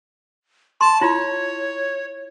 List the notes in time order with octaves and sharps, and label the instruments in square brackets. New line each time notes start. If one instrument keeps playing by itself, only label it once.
[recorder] A5 [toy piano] C6
[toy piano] E4 F4 [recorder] C#5